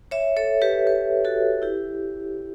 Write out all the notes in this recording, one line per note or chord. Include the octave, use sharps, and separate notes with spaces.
C#5 E5
A4 C#5
G4 B4
G4 B4
F#4 A4
E4 G4